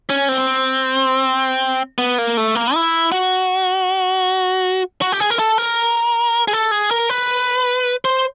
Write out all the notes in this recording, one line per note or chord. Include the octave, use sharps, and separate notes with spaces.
C#4
C4
B3
A#3
A3
A#3
E4
F#4
F#4
G4
G#4
A#4
A4
A#4
G#4
A4
G#4
A#4
B4
C5